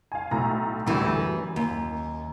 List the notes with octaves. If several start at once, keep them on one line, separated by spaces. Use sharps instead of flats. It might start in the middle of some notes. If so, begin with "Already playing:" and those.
F5 G#5
B1 A2 A#5
D2 A2 E3 G3
F#2
D#2